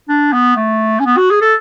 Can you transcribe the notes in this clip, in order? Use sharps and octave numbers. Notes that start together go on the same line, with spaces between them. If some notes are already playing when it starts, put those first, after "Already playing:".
D4
B3
A3
C#4
B3
F#4
G#4
A4